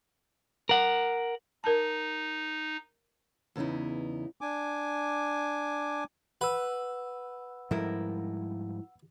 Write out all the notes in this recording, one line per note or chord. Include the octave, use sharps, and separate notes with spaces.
A#4 F#5
D#4 A#4 A5
E2 C#3 B3 D#4 E4
D4 G#5 D6
B4 F#5 E6
G#2 F3 G3 E4 A#4